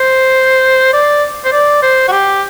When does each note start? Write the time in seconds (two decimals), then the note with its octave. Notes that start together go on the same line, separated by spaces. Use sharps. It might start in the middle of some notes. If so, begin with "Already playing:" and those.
Already playing: C5
0.93 D5
1.45 C5
1.52 D5
1.83 C5
2.08 F#4
2.12 G4